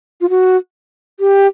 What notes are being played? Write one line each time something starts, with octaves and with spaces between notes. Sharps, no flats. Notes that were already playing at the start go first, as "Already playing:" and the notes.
F4
F#4
G4